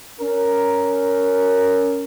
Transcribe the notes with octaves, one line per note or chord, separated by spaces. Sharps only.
C#4 A#4